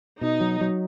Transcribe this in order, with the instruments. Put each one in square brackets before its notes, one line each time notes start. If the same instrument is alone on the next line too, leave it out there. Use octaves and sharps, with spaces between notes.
[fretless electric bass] B2 [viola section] D#4
[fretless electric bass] F#3
F#3